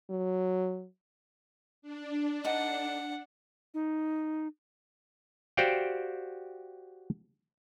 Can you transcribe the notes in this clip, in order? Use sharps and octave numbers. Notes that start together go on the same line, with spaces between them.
F#3
D4
D#4 A4 F#5 D6
D#4
F#4 G4 C5 D5 F5 G5